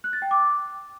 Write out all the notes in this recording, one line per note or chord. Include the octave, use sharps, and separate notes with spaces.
F#6
A6
G5
D6